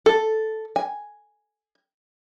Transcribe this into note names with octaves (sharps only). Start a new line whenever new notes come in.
A4
G#5